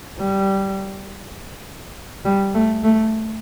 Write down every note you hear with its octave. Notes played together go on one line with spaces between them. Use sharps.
G3
G3
A3
A3